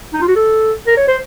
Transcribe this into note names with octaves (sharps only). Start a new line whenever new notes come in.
D#4
F4
F#4
A4
A#4
C#5
C5